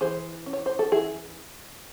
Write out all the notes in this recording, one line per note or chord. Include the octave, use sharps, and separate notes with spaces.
E3 G#4 C5
C#4
C#5
C5
A4
E3 E4 G#4